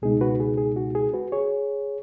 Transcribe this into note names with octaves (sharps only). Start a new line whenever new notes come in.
C#2 B2 G#3 D#4 G#4
F#4 B4
G#4
G#4
F#4
G#4
F#4 B4
G#4 C#5